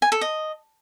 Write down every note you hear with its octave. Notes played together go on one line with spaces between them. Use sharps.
G#5
A4
D#5